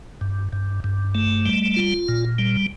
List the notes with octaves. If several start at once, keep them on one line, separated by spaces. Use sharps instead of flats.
G2
G2
G2
A3
G3
F4
A#2
G3